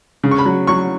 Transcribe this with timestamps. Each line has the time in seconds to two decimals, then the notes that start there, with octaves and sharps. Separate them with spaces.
0.24 C#3
0.31 C#6
0.39 B5
0.45 F#3
0.67 F#3 C#6